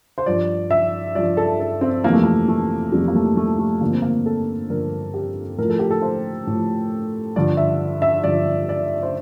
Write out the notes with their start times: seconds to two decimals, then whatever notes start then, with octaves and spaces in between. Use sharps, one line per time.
0.18 C5
0.26 G2 F3 D5
0.71 E5
1.15 G2 F3 D5
1.37 A4
1.60 A4
1.81 C4
2.04 F2 C3 E3 A#3
2.13 A3
2.23 A#3
2.48 A3
2.92 F2 C3 E3 G3
3.08 A#3
3.15 A3
3.37 A3
3.59 A3
3.81 G2 D3 F3 A#3
3.92 C4
4.02 A#3
4.26 A4
4.70 G2 D3 F3 A#4
5.14 G4
5.58 A2 F3 A#4
5.70 A4
5.79 G4
5.91 A4
6.02 C5
6.47 A2 F3
7.36 G2 D3 F3 D5
7.57 E5
8.02 E5
8.24 G2 D3 F3 D5
8.69 D5
9.03 C5